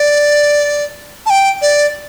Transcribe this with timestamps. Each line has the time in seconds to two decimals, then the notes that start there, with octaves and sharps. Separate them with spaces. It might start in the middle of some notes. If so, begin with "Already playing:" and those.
Already playing: D5
1.26 A5
1.30 G5
1.62 D5